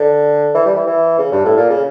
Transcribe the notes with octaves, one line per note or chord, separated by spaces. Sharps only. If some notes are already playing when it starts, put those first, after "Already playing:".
Already playing: D3
E3
G3
E3
E3
C#3
G2
A2
A#2
C#3